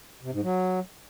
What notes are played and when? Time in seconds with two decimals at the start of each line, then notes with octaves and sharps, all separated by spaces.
0.23 C3
0.33 G#2
0.42 F#3